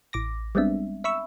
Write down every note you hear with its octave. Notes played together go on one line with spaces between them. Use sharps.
A1 D6 A#6
G3 G#3 B3 C4 D4 E5
E5 B5 C#6 E6